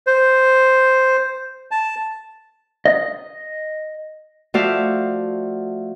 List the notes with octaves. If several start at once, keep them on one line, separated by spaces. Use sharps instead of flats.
C5
A5
D#5
F3 A3 F#4 D5 E5 F5